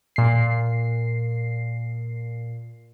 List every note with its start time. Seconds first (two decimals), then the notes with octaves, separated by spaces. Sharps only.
0.16 A#2 C7